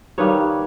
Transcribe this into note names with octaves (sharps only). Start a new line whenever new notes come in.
D#3 G3 A#3 D#4 B4 C#5